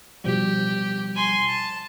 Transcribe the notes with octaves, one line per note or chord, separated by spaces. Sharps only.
B2 F3 G3 G4
G#5 C6
A5